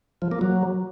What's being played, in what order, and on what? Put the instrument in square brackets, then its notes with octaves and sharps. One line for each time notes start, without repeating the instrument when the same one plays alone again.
[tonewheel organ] F3
A#3
F#3